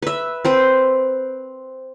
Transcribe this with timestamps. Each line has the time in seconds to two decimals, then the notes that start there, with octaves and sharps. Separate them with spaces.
0.02 B4 E5
0.45 C4 B4 C5